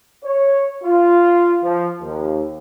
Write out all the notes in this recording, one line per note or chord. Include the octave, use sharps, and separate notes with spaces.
C#5
F4
F3
D#2